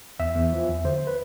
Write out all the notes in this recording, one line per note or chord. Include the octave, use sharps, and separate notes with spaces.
E2 E5
E2
F3
E2
D3 C5
B4